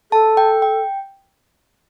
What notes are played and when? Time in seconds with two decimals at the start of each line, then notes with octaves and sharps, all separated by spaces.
0.12 A4 A5
0.37 G5
0.62 G5